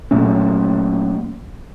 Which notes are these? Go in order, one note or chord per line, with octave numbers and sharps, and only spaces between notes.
A#2 F#3 A3 C#4